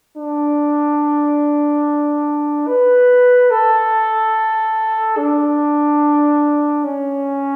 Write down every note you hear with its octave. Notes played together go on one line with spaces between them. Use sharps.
D4
B4
A4
D4
C#4